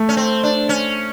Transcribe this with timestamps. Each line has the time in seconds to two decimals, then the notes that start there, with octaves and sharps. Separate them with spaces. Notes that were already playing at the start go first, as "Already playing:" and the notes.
Already playing: A3
0.09 C#4
0.17 C4
0.43 D4
0.69 C#4